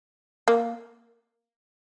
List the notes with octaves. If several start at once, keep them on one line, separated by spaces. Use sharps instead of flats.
A#3